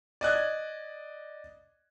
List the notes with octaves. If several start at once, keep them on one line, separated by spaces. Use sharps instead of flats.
D5 D#5 F#6 G#6